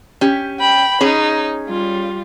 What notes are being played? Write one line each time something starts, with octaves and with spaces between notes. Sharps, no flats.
C#4 G4
G5 B5
C#4 D#4 G#4 C#5
G3 F4